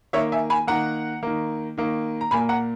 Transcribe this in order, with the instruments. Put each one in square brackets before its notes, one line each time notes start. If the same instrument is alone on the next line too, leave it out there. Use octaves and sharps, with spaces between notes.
[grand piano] D#3 A#3 C#5 E5
E5 G#5
G#5 B5
D#3 A#3 F#5 A#5
D#3 A#3
D#3 A#3
A#5
A#2 A#3 G#5 B5
F#5 A#5